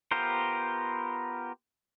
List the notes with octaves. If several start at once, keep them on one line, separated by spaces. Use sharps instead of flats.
B3 F4 G4 A#4 C5